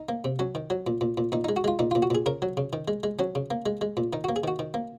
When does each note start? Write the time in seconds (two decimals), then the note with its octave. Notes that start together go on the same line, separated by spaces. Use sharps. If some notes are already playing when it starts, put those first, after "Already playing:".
Already playing: D#4
0.09 A#3
0.24 C3
0.39 F#3 C#4
0.55 D#3
0.70 F#3
0.87 A#2
1.01 A#2
1.18 A#2
1.32 A#2 D#4
1.44 G#3 D#4
1.56 F#4
1.64 G#3 F4
1.79 A#2 D#4
1.91 A#2 F4
2.02 F#4
2.10 A#2 G#4
2.26 C#3 A#4
2.42 F#3
2.57 C#3
2.73 D#3
2.88 G#3
3.03 G#3
3.19 F#3 C#4
3.35 C#3
3.51 A#3
3.66 G#3
3.81 G#3
3.97 A#2
4.13 D#3 D#4
4.24 A#3 F#4
4.36 G#4
4.44 D#3 F#4
4.59 D#3
4.74 A#3